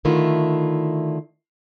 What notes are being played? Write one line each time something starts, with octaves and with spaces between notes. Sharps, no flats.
D3 D#3 A3 E4 F4